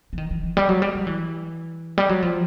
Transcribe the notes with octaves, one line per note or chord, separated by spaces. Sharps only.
E3
D#3
E3
E3
G3
F#3
G3
F#3
E3
G3
F#3
F3